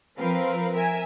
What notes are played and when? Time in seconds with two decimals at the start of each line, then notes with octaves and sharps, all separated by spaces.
0.18 F3 C4 A#4 B4 F5
0.73 A#4 E5 G#5